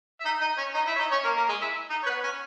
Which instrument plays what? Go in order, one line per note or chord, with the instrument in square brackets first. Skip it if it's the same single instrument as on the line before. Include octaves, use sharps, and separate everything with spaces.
[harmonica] E5
D#4 D#5
D#4 D#5
C#4 C#5
D#4 D#5
E4 E5
C#5
D#4 D#5
C#4 C#5
A#3 A#4
A#3 A#4
G#3 G#4
E4 E5
D#4 D#5
C#5
B3 B4
C#4 C#5